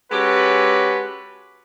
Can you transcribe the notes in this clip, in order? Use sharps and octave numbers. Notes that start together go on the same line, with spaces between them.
G#3 C#4 F#4 G4 A4 B4